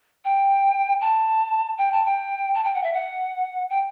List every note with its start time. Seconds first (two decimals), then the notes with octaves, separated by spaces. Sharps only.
0.25 G5
1.01 A5
1.78 G5
1.92 A5
2.05 G5
2.55 A5
2.64 G5
2.74 F#5
2.83 E5
2.93 F#5
3.70 G5